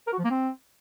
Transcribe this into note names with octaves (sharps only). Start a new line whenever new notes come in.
A#4
F#4
F3
A#3
C4